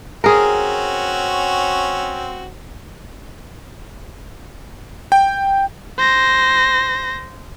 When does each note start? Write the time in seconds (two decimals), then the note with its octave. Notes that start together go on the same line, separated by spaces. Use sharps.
0.24 C4 C#4 F#4 G#4 A#4
5.12 G5
5.98 C5 A#6